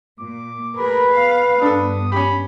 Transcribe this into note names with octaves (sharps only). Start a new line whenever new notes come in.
A#2 D6
A3 G#4 A#4 B4 B5
B3 F5
G2 B3 D4 A4 D#6
C#4 G4 B5